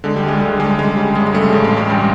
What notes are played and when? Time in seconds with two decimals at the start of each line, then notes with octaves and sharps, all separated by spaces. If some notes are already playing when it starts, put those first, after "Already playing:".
0.04 D3 G#3
0.16 G3
0.23 D2
0.28 G#3
0.41 D3 G3
0.60 D3 G#3
0.78 C#3 G#3
0.97 C#3 G3
1.16 F#2 G#3
1.27 G#3
1.34 C#3 G3 A3
1.53 A1 G#3
1.64 G#3
1.71 A1
1.77 G3
1.89 G2 G3